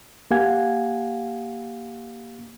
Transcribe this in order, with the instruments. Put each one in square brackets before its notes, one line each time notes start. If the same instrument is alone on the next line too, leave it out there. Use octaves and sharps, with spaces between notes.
[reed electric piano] A#3 G4 F5 F#5 G#5 G#6